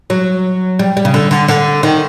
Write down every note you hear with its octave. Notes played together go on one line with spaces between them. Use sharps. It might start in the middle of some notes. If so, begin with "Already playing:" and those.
F#3
G3
G3
C#3
D3
D3
D3
D#3